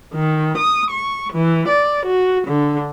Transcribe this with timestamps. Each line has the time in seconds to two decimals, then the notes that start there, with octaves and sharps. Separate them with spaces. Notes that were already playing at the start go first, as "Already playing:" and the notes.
0.14 D#3
0.56 D#6
0.91 C#6
1.32 E3
1.68 D5
2.05 F#4
2.46 D3